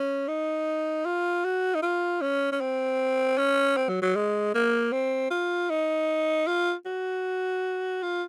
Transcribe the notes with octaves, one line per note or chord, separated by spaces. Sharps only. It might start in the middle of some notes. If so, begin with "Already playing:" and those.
Already playing: C#4
D#4
F4
F#4
D#4
F4
C#4
C#4
C4
C#4
C4
F#3
F#3
G#3
A#3
C4
F4
D#4
F4
F#4
F4